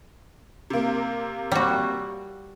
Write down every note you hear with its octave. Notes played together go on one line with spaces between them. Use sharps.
C3 A#3
G3 F#4